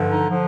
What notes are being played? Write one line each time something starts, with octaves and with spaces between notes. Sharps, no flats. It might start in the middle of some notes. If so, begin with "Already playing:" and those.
Already playing: G2 D3 F3
D#4
D3 F3